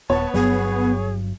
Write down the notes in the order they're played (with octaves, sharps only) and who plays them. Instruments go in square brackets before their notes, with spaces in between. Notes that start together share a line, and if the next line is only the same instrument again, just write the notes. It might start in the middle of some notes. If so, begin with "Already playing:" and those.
[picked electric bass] D#1 [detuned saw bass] B3 [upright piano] C#5 [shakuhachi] A5
[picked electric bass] G1 G2 F#3 [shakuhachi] G#4